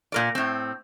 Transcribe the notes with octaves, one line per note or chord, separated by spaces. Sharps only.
A#2 A#4 D5
A2 C4